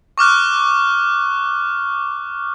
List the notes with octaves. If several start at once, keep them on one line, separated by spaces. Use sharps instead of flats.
C#6 D6 F6 F#6